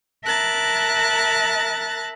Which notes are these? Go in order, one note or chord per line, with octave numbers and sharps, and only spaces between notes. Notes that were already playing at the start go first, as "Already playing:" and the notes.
A#4 E5 A5 A#5 F#6 A6